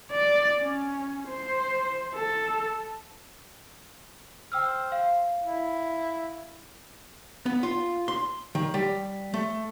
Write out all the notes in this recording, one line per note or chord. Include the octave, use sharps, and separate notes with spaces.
D5
C#4
C5
A4
C5 G5 E6 F6
F5
E4
B3
F4
C6
D#3
G3
A3